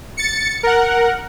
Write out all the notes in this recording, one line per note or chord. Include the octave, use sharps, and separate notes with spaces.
A6 C#7
A#4 F#5